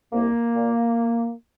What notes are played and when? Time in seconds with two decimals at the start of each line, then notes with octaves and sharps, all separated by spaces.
0.13 C2 A#3
0.55 A#2